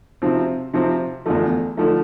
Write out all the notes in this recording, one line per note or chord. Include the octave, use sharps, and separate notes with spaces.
C3 F3 C4
C3 F3 C4
E2 D3 F3 A3
D3 F3 A3